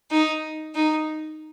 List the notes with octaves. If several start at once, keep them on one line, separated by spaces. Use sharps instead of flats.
D#4
D#4